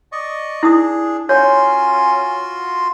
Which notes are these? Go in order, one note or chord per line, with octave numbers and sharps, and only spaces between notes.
D5 D#5 C#6
D4 E4 G#4 D#6
C#4 F4 F#4 C#5 C6